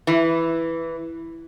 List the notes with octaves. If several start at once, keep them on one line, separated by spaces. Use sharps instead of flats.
E3